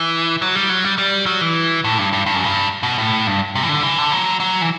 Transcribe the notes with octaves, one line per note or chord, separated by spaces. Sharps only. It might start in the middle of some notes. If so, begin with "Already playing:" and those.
Already playing: E3
F#3
G3
F#3
G3
G3
F#3
E3
A2
G2
G2
G2
F#2
G2
B2
A2
G2
C3
E3
D3
E3
D3
F#3
F#3
E3